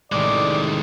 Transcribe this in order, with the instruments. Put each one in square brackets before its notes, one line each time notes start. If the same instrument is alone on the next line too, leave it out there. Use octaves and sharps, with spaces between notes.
[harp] A1 D#3 [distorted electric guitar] C3 G#3 [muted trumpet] D5 [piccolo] D6